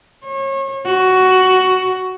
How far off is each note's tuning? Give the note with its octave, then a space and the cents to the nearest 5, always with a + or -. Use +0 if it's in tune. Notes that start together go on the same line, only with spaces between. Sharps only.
C#5 -35
F#4 +10